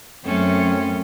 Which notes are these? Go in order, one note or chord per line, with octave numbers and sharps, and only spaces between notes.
F#2 A3 C4 C#4